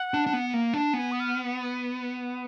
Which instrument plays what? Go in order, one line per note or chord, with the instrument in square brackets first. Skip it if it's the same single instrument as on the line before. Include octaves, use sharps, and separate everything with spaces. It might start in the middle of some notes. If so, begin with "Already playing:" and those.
Already playing: [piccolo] F#5
[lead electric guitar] D4
D4
B3
A#3
D4
[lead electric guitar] B3 [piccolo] G#5
[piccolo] D#6
F6